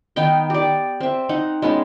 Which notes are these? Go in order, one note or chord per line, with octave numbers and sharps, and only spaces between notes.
D#3 B3 D#4 G5
G4 D5
C4 E5
D#4 F#5
G#3 B3 C#4 D#4